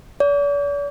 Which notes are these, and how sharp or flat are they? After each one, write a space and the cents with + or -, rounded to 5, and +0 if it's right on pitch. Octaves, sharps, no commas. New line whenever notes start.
D5 -45